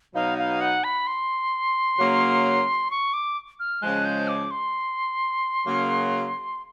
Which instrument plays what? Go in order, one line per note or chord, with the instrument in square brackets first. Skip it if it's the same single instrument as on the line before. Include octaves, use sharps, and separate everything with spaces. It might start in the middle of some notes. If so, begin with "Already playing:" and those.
[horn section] B2 F#3 B3 D#4 [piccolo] F5
[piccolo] F5
F#5
B5
C6
[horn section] C#3 F#3 A#3
[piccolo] C#6
D6
F6
[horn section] C#3 F3 G#3 [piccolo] F#6
[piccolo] G6
D6
C6
[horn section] C#3 F#3 A#3